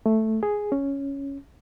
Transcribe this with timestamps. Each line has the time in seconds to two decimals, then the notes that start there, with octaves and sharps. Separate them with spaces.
0.06 A3
0.43 G#4
0.72 C#4